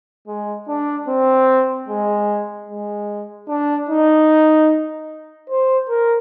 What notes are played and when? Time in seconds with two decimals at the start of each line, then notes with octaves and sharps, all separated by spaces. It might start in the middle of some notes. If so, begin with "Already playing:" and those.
0.28 G#3
0.68 D4
1.08 C4
1.88 G#3
2.69 G#3
3.49 D4
3.89 D#4
5.50 C5
5.89 A#4